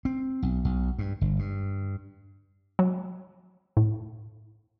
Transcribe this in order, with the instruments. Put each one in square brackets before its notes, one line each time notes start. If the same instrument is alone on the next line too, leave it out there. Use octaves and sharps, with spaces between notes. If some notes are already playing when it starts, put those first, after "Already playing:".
[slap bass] C4
B1
B1
G2
G1
G2
[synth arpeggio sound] F#3
A2